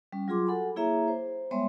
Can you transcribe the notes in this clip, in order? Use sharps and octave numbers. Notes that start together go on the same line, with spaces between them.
G3 C#4
F#3 F4 G#4 C6 D6
F#4 A4 F#5 G#5 B5
A#3 E4 G#4 C#5 E5 A#5
C5
G3 G#3 B3 C#5 E5 C6